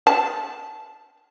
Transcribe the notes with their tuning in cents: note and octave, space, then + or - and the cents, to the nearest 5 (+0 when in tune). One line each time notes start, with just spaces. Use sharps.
A5 -15